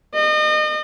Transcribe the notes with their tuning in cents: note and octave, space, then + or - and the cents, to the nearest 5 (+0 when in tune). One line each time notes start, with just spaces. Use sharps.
D#5 -35